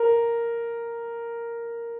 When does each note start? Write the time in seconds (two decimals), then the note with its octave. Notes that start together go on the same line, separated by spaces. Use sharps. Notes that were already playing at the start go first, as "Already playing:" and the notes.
Already playing: A#4